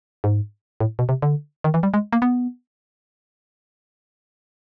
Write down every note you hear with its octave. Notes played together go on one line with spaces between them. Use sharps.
G#2
A2
B2
C3
D3
D#3
E3
G3
G#3
A#3
B3